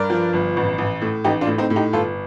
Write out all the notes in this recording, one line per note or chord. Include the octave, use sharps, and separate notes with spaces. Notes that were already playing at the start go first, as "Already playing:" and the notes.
Already playing: G2 A#4 D5
F3
G1
A1
A1
A2
A1 D#4 G4
D4 F4
A2
C4 D#4
A2
D#4 G4
G1 F4 A4